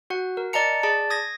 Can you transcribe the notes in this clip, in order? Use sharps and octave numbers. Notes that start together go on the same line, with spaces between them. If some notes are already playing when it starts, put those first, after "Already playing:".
F#4 F#5
A#4
D5 D#5 A5 A#5 C#7
G#4 D5 A5
D#6 G#6 A#6